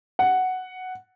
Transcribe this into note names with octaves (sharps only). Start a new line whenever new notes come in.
F#5